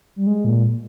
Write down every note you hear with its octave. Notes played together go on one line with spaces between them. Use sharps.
G3
G#3
A#2